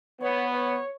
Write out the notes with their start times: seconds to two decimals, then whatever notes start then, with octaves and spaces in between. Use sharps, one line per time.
0.21 B3 C#5
0.54 C#5